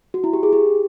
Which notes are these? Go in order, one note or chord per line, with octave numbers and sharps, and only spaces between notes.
F#4
E4
G4
G#4
G4